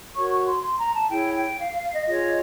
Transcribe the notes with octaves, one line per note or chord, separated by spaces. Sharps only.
F#4 A#4 C#5 C#6
C#6
C6
C6
A#5
A5
E4 G#4 C#5 G5
G5
F5
F5
F5
D#5
F4 G#4 C#5 D#5